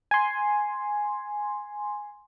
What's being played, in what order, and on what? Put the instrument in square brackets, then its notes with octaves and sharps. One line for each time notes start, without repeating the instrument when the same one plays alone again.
[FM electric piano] G#5 C6